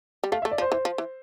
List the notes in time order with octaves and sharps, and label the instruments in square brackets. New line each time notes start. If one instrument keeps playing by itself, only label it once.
[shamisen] G3
[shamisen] A3 [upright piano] F5
[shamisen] A3 [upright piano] E5
[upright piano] D5
[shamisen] F3
[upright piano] C5
[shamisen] E3 [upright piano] C5
[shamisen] F3
E3